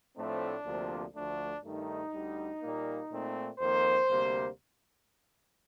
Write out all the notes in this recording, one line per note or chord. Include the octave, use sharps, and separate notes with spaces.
A2 F3 A3 C4 D4
D2 C3 F3 A#3
D2 D3 F3 A3 D4
G2 D#3 A3 D#4
D2 D3 G3
A#2 G3 A#3
A#2 A3 C4
F2 D#3 A#3 C5
D2 C3 G3 A#3